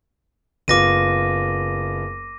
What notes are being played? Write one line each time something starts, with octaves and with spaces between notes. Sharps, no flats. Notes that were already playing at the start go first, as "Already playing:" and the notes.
F#1 B3 F4 D6 A#6 D#7